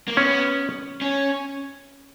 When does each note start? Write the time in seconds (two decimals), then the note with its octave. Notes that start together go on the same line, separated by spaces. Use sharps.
0.08 A#3
0.16 B3 C#4
1.02 C#4